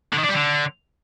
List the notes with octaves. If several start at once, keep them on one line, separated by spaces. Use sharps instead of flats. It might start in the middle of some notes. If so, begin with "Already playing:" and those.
D3
D#3
D4
G3
D3